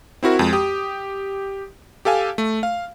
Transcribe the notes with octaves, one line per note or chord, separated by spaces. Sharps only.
C4 E4 F#4 A#4
F2 G#3
G4 D#6
G4 A4 F5 G#5
A3
F5